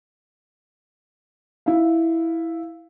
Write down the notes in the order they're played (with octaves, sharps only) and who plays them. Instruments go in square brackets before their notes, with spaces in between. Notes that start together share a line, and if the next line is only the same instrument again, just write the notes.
[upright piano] E4 F5